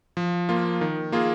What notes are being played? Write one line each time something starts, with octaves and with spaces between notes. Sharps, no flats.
F3
A#3 F4
D#3
A#3 F4 G#4